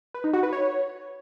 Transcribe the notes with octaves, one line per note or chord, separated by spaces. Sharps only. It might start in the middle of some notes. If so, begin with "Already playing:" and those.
B4
D#4
F#4
B4
C#5